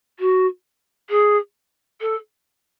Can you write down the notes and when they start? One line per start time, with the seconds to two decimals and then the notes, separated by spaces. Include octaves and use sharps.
0.19 F#4
1.10 G#4
2.01 A4